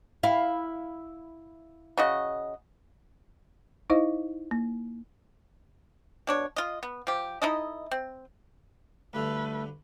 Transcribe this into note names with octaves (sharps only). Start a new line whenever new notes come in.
E4 F5
C#3 F#4 D#5
D#4 E4 C5 D#5 F5
A#3
B2 D4 C#5
F4 D#5
B3
F3 G4
D#4 E4 A4 D#5
C4
D2 G2 D3 A3 B4